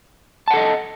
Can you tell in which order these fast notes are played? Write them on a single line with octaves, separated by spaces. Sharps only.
A5 F#5 A4 D#5